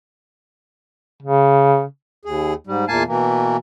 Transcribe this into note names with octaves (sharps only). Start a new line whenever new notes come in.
C#3
D#2 G#4
G#2 G3
E2 A#2 A#3 F5 G#5 A5
B2 E3 A#3